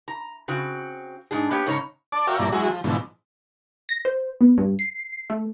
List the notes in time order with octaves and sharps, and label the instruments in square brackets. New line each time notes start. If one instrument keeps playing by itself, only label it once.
[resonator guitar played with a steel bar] A#5
C#3 C4 F#4
G#2 D4 G#4
A#3 B3 G4 C#5
G#2 C#3 C#4 C#5 A#5
[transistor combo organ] D5 A5 D6
F#4 A#4 C#5 E5 F5 G5
G2 A#2 F3 E4 D5 A#5
F#3 G#3 E4 F#4 G#4
F3
G#2 B2 D3 E3 F3
[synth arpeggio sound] A#6
C5
B3
G2
C7
A3